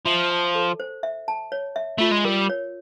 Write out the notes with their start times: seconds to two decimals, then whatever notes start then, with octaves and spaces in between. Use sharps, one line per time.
0.06 F3 E5
0.30 A5
0.55 A4
0.80 C5
1.03 E5
1.28 A5
1.52 C#5
1.76 E5
1.98 A3 F4
2.11 G#3
2.24 G3 A#4
2.49 C#5